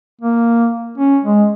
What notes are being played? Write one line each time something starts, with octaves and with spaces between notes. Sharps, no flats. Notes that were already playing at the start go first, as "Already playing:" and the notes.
A#3
C#4
G#3